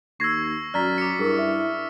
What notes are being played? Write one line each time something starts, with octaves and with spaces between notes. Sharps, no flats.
D#2 C#6 E6 G#6 A#6 C7
F#2 F#4 D5 A#5 F6 A6 B6
D6 B6 C#7
G2 E4 G#4 A#4
E5